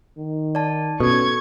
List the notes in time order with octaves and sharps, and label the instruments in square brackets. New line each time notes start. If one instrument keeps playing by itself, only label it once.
[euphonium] D#3
[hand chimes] D5 A5
[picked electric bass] B2 [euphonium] C#4 [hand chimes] A4 [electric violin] C#6 G#6